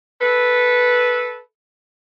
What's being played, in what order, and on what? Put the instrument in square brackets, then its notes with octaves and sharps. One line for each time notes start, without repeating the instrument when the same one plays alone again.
[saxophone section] A4 B4